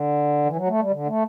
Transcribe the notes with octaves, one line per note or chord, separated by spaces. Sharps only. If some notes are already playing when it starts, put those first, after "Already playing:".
Already playing: D3
E3
F#3
A3
G3
D3
A3